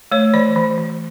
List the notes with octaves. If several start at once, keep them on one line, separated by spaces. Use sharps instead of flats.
A3 C#5
E3 D5
E3
E3